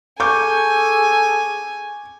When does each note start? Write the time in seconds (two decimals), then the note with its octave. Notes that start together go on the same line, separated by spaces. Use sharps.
0.20 G#4 A4 G#5 C#6 D6 G6